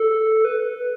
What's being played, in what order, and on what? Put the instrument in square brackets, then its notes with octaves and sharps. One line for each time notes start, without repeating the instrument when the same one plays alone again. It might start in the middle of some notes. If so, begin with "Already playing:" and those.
Already playing: [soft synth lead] A4
B4